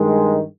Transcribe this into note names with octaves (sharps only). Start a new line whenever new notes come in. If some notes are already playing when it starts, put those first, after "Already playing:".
Already playing: G2 D#3 G#3